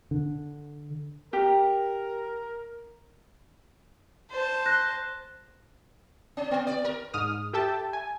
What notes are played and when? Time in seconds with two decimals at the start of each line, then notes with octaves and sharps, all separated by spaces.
0.11 D3
1.33 G4 A#4
4.30 C5 A5
4.66 F#6 A#6
6.37 C#4
6.51 B3
6.67 D5
6.84 A#4
7.14 G#2 D#6 F6
7.53 G4 A4 E5 G5 A5
7.93 G#5